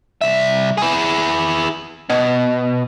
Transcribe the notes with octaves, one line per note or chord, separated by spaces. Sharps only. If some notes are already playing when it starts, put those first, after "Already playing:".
C2 E5
E4 G#4
B2